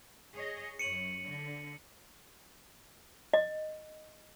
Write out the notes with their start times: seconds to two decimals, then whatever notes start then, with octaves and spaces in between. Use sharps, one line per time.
0.34 G#4 C#5 D#5
0.79 F#2 C#5 C#7 D#7 F#7
1.26 D3
3.34 D#5